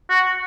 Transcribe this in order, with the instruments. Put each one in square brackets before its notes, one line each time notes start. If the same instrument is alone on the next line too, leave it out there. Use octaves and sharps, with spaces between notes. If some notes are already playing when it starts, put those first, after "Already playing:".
[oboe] F#4